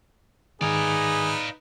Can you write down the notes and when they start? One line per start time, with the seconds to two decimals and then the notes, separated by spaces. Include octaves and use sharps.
0.61 G#2 D#3 D#4 G#4 B4 D5 F5